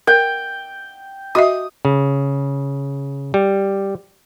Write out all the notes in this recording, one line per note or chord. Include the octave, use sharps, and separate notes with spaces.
A#4 G5
F#4 D#5 E5 D#6
C#3
G3